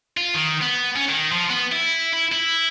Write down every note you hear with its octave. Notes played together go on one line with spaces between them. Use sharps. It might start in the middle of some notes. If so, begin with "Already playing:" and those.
F4
D#3
B3
C#4
D#3
F3
B3
E4
E4
E4